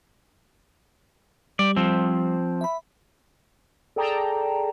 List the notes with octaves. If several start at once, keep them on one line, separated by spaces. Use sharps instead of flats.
G3 D5
F3 C4
E5 B5
G#4 A4 D5 G5 A5 A#5